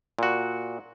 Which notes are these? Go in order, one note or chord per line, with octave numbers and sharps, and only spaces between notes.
A#2 F#4